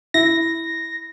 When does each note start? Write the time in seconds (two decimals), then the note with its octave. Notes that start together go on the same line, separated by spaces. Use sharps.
0.14 E4 A#6